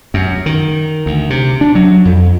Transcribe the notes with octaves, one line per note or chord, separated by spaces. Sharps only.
F#2
D#3
D2
C3
D4
F#3
F2